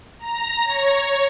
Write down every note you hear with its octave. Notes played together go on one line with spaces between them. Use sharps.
A#5
C#5